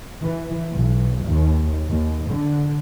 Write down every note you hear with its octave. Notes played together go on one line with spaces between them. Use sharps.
E3
B1
D#2
D#2
D3